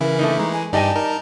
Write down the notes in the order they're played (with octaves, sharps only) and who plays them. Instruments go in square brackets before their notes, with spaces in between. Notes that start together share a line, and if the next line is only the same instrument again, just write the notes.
[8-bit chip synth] C#3 E3 E4 [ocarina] A#4
[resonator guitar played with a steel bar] A3 A#3 D#4
[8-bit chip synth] E3 G#3 [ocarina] A#5
[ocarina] G#5
[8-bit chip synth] G2 D#4 G4 [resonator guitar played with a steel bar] D5 D#5 G#5 [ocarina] A5
[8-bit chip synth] D#4 A#4